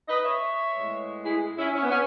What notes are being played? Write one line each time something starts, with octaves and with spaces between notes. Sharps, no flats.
B4 D#5
C#5 E5
A2 G#3 B3
E4 G#4
C#4 E4
C#4
B3
C#4